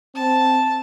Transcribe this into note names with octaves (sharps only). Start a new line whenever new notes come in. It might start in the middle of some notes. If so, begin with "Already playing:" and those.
C4 A5